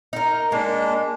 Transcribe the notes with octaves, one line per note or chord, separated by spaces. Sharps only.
D#4 A#4
G#3 A#3 D4